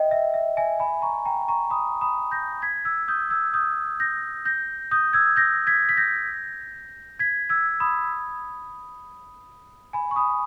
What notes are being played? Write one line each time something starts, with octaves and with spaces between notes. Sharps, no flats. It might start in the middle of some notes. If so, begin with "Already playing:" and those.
Already playing: D#5 E5 G5
E5
E5
E5 G#5
G#5 B5
A#5 C#6
G5 A#5
A#5 C#6
B5 D#6
B5 D#6
G6 A#6
G#6 B6
E6 G#6
D#6 G6
E6 G#6
D#6 G6
G6 A#6
G6 A#6
D#6 G6
E6 G#6
G6 A#6
G#6 B6
B6
G6 A#6
G#6 B6
E6 G#6
B5 D#6
G#5 B5
C#6
B5 D#6